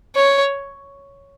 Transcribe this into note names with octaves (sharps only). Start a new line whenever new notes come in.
C#5